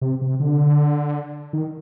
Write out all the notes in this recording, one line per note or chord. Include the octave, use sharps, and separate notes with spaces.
C3
C3
D3
D#3